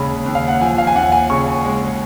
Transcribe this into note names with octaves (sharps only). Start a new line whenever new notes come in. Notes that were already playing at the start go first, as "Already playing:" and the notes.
Already playing: D#2 C#3 G#3 B5
D#2
F5
F#5
F3 G#5
F5
G#5
D#2 F#5
G#5
C#3 C#6
G#3